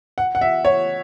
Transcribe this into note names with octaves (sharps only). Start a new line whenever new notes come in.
F#5
F#5
E5
C#5